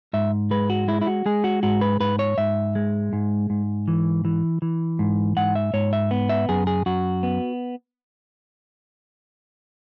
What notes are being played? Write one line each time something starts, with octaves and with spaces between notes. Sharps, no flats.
G#2 E5
G#3 B4
F#4
G#3 E4
E4
F#4
G#3 G#4
F#4
G#2 F#4
B4
G#2 B4
C#5
G#2 E5
G#3
G#2
G#2
E3
E3
E3
G#2
G#2 F#5
E5
G#2 C#5
E5
B3
E5
F#2 G#4
G#4
F#2 F#4
B3